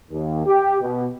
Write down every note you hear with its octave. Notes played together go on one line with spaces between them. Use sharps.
D#2
G4
B2